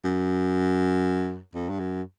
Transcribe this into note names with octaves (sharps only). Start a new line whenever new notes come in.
F#2
F2
G2
F#2